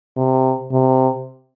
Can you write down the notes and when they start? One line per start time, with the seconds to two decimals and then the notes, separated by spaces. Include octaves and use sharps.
0.17 C3
0.72 C3